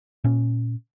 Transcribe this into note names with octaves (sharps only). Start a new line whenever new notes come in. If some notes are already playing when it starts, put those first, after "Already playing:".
A#2 C#4